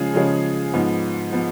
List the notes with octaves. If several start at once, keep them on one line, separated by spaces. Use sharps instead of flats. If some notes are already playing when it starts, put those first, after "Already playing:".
Already playing: C#3 F3 G#3 C#4 G#4
C#3 F3 G#3 C#4 G#4
G#2 F3 B3
F3 B3